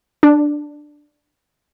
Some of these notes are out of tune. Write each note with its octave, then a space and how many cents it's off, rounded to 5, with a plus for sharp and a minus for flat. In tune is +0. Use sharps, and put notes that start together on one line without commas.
D4 +5